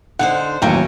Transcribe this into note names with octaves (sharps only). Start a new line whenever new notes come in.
D3 D#4 C5 F#5
A1 D#2 F#3 C#4 G5